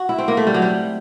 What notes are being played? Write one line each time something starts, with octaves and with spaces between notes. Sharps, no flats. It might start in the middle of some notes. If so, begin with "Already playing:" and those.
Already playing: F#4
E4
C4
A#3
A3
G3
F#3
G3